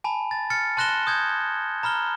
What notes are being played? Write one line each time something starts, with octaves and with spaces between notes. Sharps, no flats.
G#5 A5 B5
A6
F6 A6 C#7
A5 C6 F#6 A#6 E7 G7
D#6 G6 G#6
A#5 B5 F6 G7